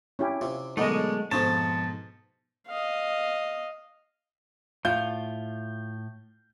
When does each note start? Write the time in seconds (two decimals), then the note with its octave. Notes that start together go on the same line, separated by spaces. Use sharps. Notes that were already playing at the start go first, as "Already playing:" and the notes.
0.19 C#4 E4 G4
0.41 C3 F4
0.77 F#2 B2 D3 G#3 A3 D#4 D#5
1.31 F2 G#2 B2 F3 C#5 A5
2.67 D#5 F5
4.85 A2 F4 G6